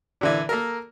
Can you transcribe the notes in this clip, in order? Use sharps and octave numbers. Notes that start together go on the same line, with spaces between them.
A#2 D3 E3
A#3 A4 A#4